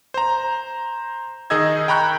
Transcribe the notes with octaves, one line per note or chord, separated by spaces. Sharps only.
C5 A#5
D#3 D#4 G#4 D#5 E6 G#6
G5 A#5 B5 C#6 F#6 G6